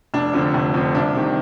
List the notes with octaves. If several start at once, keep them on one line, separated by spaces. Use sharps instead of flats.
F1 D4
F2 D3
F1
F2 D3
C2 D4
C3 D#3